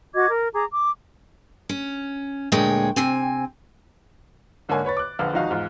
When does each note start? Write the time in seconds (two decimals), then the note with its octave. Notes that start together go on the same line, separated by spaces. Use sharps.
0.14 F#4 D#5 D6 G#6
0.29 A#4
0.54 G#4 A#5 D6
0.71 D6
1.69 C#4
2.52 D2 A#2 G#3 C#5 G5
2.96 C3 C4 G#5
4.69 G#2 D3 A#3 C#5 G#5
4.85 B4 C#5 B5 A6
4.97 D6 F#6
5.19 A#1 D3 B4 F5 F6
5.33 G#1 F3 D#4 F#4 F5
5.50 E2 G#2 F4